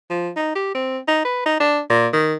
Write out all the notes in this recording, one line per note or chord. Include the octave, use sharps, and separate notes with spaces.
F3
D#4
G4
C4
D#4
B4
D#4
D4
A#2
D#3